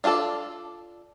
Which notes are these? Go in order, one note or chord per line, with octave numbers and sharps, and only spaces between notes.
D4 F4 F#4 A4 D5